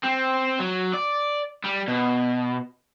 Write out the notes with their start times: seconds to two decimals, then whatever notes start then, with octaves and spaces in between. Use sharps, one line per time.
0.03 C4
0.59 F#3
0.94 D5
1.64 G3
1.88 B2